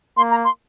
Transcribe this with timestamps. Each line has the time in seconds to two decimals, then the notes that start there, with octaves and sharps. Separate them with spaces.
0.17 A#3 C6
0.31 A#5
0.44 C6